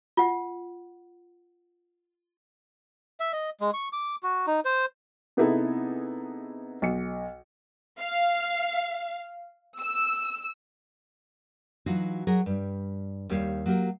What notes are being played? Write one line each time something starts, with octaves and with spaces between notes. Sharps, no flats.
F4 F#5
E5
D#5
G#3
C#6
D6
F#4
D#4
C5
C3 B3 D#4 E4 G#4 A4
B1 C#7
F5
E6
E3 F#3 D#4 F4 F#4
F#3 G#4 A#4
G2 G3
D#2 G3 C#5 F5
F#3 A#3 G4 A#4